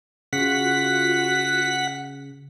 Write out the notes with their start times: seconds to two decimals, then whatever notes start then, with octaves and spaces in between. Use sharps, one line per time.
0.33 C#3 F4 F#4 F#5 B6